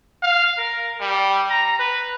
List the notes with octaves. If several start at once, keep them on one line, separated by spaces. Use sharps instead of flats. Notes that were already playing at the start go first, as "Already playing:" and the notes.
F5
A#4
G3
A#5
B4